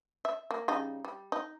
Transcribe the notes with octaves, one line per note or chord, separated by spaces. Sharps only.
E5
A#3
C#3 G3 D#4
G3
D#4